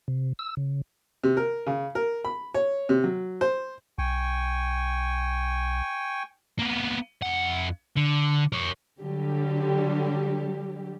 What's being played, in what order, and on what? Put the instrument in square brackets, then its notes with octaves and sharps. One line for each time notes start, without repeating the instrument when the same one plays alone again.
[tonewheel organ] C3
E6
C#3
[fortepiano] C3
A#4
C#3
A#4
B5
C#5
C3
F#3
C5
[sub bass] B1 [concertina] G5 G#5 C#6
[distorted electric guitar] A#3 B3
F2 F#5
D3
A#4 C#5
[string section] D3 F#3 G3 G4